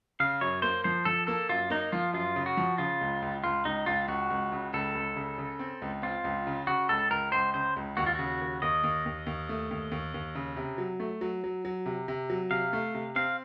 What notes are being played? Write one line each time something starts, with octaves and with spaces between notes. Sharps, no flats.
C#3 F5
F#2 C#5
A#3 C5
F3 C5
F3 A4
A#3 A4
F#2 F4
A#3 D#4
F3 F4
F#2 F4
C#3
F#4
F3
C#3 F4
C#2
C#2
C#2 F4
C#2 D#4
C#2 F4
C#2 F#4
C#2
C#3
C#2 A4
C#2
C#3
C#3
C4
C#2
C4 F4
C#2
C#3
C#3 F#4
C#2 A4
C#2 A#4
C#2 C5
C#3 C5
C#2
D#2 F#4
F4
C#3 F#4
D#2
D#2 D#5
D#2
D#2
D#2
A3
D#2
D#2
D#2
C#3
C3
F#3
A3
F#3
F#3
F#3
C3
C3
F#3
C3 F5
A3
C3
C4 F5